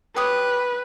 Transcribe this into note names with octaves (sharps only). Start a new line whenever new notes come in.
G4 B4 C#5 D#6